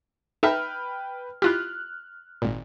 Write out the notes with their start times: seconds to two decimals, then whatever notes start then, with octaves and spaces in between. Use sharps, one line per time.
0.43 D#4 B4 E5 G5 A5 F6
1.42 E4 F4 G4 F6 F#6
2.42 G#1 A#2